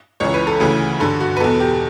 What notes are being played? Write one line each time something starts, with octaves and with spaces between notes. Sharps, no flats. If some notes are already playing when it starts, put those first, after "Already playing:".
C#2 C#3 E3 C#5
B4
A4
D2 C#3 E3 B4
G2 D3 A4
F#4
B4
E2 B2 A4
G4